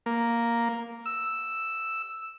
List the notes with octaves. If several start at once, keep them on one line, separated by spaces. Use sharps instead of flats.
A#3
E6